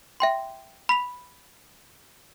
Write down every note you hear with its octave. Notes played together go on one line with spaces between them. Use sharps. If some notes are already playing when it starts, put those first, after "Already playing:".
E5 G5 C6
B5 B6 F7